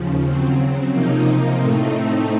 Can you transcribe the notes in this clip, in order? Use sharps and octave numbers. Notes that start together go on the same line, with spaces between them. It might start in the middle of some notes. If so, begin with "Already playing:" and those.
Already playing: D#2 C#3 F3
C#3 F#3 C4
C3 F3 A#3 D#4
A2 A3 C4 D#4